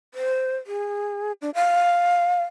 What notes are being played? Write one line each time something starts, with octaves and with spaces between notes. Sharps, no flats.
C5
G#4
D4
F5